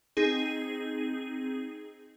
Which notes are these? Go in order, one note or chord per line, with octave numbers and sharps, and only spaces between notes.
C4 D#4 G#4